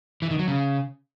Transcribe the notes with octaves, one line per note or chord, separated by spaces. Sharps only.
E3
D#3
F#3
C#3